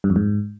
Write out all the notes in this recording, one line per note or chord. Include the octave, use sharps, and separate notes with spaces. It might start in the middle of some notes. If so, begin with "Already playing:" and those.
G2
F2
G#2